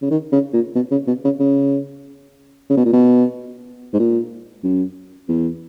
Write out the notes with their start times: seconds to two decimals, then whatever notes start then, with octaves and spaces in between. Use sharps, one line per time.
0.02 C#3
0.10 D#3
0.32 C#3
0.53 A#2
0.75 B2
0.91 C#3
1.07 B2
1.24 C#3
1.40 C#3
2.70 C#3
2.77 B2
2.85 A#2
2.93 B2
3.93 G#2
3.99 A#2
4.64 F#2
5.29 E2